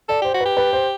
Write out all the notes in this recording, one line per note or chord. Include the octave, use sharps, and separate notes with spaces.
A4 D5
G4 C5
F#4
G4 B4
B4
C5